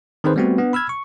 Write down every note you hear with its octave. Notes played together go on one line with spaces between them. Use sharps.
D#3 C4 D#4 G#4 B4 C5
G3 A3 B3 C4 F#4
B3 D4
B5 E6 F6 G#6
C#6